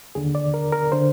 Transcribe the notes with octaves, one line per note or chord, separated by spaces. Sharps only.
D#2 D3 G#4
D5
A#4
A#4
D3 C5